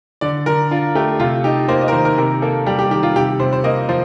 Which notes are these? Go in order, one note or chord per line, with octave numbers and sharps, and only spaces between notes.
D3 D5
D3 A#4
D4 F4
A3 G4
C3 F4
D#4 G4
A#3 C5
D#5
A#4
D#3 C5
A#4
C3 A#4
A#3 A4
G3 G4
G4
D#3 G4
F4
C3 G4
C3 C5
C5
A#3 D#5
F3 C5